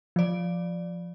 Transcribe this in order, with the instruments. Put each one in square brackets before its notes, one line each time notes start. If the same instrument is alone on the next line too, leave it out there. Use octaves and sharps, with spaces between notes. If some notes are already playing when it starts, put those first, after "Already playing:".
[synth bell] F3 D5